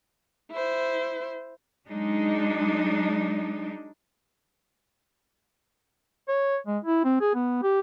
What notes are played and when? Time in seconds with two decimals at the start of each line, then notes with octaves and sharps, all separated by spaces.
0.51 E4 C5
1.87 F#3 G#3 D4 D#4
6.28 C#5
6.67 G#3
6.85 E4
7.04 C4
7.21 G#4
7.35 B3
7.63 G4